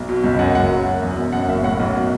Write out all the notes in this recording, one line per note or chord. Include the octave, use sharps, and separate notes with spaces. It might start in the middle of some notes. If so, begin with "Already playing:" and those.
Already playing: B1
B2
C#2
F#2 F#5
F#1 F#5
F#3
F#2
E2
E1
F#2 F#5
F#1 E5
A2 F#5
B1
B2